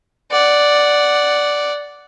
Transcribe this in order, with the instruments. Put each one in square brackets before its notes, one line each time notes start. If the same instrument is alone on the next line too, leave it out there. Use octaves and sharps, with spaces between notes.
[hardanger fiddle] D5 F#5